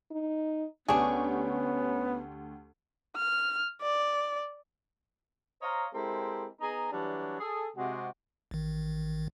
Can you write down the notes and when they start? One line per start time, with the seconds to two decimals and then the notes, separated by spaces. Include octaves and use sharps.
0.11 D#4
0.88 D2 B3 C#4 D4 G4 G#4 C#6
3.16 F6
3.81 D5
5.62 C5 C#5 D#5 F5 A#5
5.94 G#3 C4 E4 G4 A4 A#4
6.60 B3 D#4 G#4 A#5
6.91 E3 F#3 G3 D4
7.40 G#4 A4
7.76 C3 G#3 F#4
8.51 A1 D#3